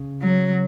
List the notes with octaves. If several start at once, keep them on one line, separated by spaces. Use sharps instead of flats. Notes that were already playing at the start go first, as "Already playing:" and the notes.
Already playing: C#3
F#3